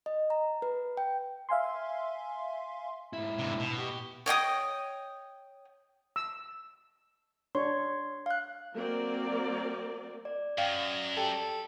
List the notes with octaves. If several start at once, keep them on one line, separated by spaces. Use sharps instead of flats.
D#5
A#5
B4
G5
E5 F5 G#5 C6
G#2 E4
G2 C3
B2
G4
C#5 D#5 G5 D#6
E6
D4 C#5 C6
F5 F#6
F#3 A#3 C4 A#4 D5
D5
F#2 F5 G5 D#6
G4 A4